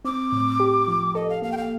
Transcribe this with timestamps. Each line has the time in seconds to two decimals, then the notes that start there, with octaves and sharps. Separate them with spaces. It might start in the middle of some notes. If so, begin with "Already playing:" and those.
0.05 C4 D6
0.32 A2
0.60 G4
0.87 F3
1.15 A4 D#5
1.29 F5
1.42 A#3 F5
1.51 G5
1.57 F5